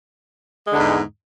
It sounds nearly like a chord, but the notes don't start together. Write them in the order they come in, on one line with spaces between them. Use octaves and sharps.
G#3 D3 E2 G#2